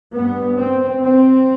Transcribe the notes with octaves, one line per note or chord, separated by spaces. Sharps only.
G2 B3
C4
C4